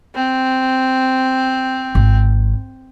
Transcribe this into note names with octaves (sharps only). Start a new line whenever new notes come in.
C4
G#1